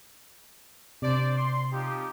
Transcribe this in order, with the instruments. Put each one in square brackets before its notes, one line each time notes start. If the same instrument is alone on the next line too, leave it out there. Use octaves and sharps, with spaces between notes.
[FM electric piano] C3 [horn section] D4 C5 D5
[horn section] C6
F3 D#4 G4